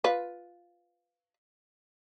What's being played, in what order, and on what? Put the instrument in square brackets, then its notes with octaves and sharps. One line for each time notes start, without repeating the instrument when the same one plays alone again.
[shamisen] F4 B4